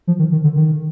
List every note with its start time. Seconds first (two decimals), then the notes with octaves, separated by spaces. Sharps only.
0.07 F3
0.19 D#3
0.32 D#3
0.44 D3
0.56 D#3